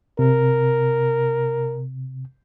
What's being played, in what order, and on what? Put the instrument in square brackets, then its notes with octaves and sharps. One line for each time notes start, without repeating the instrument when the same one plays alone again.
[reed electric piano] C3 [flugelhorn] A#4